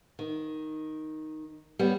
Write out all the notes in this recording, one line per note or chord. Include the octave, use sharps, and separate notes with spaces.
D#3
G3 B3 C#5